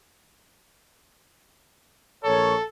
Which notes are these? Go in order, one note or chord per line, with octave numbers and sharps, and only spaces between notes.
A#1 A4 A#4 C#5